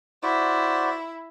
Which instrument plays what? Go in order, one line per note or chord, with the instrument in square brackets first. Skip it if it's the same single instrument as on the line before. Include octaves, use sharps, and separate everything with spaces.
[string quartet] E4 [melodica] F#4 C5 D5